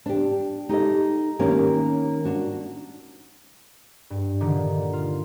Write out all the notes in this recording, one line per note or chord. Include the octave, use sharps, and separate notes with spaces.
D4 G4
D#4 G4 A4 D#5
D#3 A#3 C#4 G4
D4 F#4
G2
A#2 D3 D#3
F4